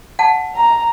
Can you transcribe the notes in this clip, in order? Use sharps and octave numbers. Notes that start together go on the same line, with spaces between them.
F#5 A5
A#5